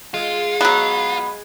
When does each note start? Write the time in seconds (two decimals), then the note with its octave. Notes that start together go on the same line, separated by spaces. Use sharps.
0.14 G#3 F4
0.61 F#3 B3